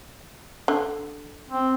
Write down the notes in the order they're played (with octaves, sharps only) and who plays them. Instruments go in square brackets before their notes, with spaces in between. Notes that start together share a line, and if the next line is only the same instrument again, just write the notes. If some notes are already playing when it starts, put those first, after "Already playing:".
[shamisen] D3
[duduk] C4